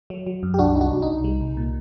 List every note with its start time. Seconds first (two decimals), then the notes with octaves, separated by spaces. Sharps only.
0.10 F#3
0.26 F#3
0.43 F#2
0.54 G4
0.59 C2 D4 F#4
0.75 C2 D#4
0.81 D4 F#4
0.92 C2
1.02 D#4
1.08 C2
1.24 G3
1.41 C2
1.57 A#2